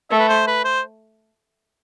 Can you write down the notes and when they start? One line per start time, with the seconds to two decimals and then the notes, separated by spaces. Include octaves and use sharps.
0.11 A3 E5
0.20 B4
0.29 C5
0.47 B4
0.65 C5